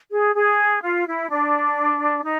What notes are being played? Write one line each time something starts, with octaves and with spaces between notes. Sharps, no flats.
G#4
G#4
F4
E4
D4
D#4